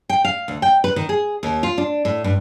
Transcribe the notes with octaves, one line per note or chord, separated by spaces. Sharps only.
G5
F5
D2
G5
B4
D#3
G#4
D#2
F4
D4
A2
G2